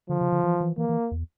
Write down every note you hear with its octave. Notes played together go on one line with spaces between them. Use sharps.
D3 F3
C#3
D3
E3
E3
E3 A#3
E3
E2